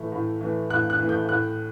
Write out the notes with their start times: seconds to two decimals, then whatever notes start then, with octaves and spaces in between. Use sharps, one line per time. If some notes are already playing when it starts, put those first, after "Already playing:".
Already playing: A2 E3 A3
0.12 A2
0.41 E3 A3
0.70 A2 F#6
0.90 F#6
0.99 E3 A3
1.09 G6
1.29 A2 F#6